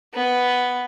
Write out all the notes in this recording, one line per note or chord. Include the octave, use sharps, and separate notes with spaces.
B3